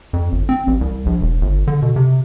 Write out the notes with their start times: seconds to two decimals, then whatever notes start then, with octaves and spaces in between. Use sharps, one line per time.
0.13 F2
0.32 G1
0.49 C4
0.67 A1
0.81 C2
1.06 A#1
1.21 E1
1.41 G1
1.67 D3
1.82 B2
1.96 C3